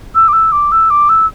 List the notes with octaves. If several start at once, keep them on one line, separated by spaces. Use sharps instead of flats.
E6
D6
E6
D6
E6
D6
E6